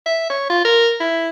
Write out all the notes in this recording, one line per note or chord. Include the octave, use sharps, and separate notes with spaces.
E5
C#5
F4
A#4
E4